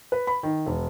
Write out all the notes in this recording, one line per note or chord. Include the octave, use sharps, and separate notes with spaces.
B4
B5
D#3
E1